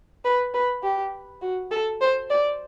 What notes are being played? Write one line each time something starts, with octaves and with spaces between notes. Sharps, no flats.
B4
B4
G4
F#4
A4
C5
D5